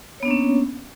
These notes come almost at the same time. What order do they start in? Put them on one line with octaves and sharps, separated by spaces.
C#5 B3 D4 A#3 C#4